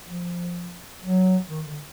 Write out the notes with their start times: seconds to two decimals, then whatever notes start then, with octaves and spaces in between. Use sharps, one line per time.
0.08 F3
1.02 F#3
1.50 D#3
1.66 D3